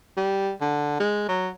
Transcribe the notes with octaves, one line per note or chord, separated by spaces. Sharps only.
G3
D3
G#3
F#3